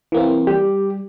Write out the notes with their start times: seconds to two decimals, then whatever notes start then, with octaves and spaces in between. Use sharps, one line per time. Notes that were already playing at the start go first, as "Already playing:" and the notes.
0.12 E3 A#3 C4
0.47 G3 G4